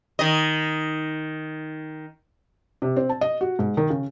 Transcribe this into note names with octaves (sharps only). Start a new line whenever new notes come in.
D#3 D#5
C3
C4
A5
D#5
F#4
G#2
D#3
C#3